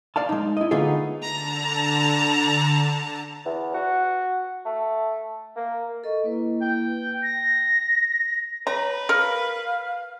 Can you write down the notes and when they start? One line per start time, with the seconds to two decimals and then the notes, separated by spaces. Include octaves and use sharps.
0.16 D5 F5 A5
0.29 G#3 D#4
0.57 E4 D#5
0.71 D3 A3 B3 D#4 F4 G#4
1.21 D3 A5 A#5
3.45 E2
3.74 F#4
4.65 A3
5.56 A#3
6.04 A4 D#5 C#6
6.24 A#3 E4 B4
6.62 G5
7.23 A#6
8.67 B4 C#5 A#5
9.09 A#4 F5